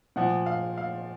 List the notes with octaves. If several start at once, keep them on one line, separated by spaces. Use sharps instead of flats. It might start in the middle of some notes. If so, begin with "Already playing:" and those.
A#2 F3 F#5
F5
F5